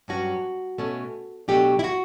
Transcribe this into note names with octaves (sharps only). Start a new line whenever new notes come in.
G2 F#3 C#4 F#4
B2 A3 C#4
B2 F#3 A3 D4 G4
E4
F#4